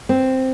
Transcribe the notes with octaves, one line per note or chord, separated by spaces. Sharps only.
C4